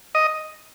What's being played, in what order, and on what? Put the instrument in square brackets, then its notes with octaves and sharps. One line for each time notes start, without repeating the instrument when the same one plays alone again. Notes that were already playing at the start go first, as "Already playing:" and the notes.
[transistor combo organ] D#5